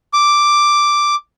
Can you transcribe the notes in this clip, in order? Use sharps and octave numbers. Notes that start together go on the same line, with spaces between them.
D6